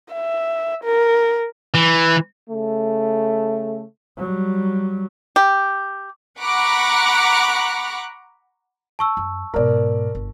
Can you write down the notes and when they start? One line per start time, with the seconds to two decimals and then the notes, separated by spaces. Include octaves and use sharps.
0.13 E5
0.84 A#4
1.75 E3
2.50 C#3 A3
4.18 F#3 G3
5.36 G4
6.41 F#5 A#5 B5 C#6 D6 F#6
8.99 A5 C#6 E6
9.17 F#2
9.54 G#2 B2 A#4 D5
10.15 G1